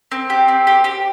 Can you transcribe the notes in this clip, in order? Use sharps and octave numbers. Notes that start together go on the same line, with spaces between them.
C4
G4
C4
G4
G4